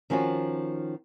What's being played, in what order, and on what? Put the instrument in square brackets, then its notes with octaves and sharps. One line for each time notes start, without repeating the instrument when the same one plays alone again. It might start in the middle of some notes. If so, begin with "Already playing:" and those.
[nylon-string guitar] D#3 F3 C#4 F4 F#4